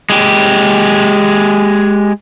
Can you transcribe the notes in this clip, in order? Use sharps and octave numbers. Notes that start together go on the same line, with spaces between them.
G#3 G4